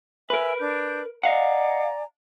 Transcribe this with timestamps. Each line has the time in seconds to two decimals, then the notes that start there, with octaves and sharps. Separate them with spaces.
0.30 A#4 B4 E5 G#5
0.59 D4 G6
1.23 D5 D#5 F5 F#5 G#5 A#5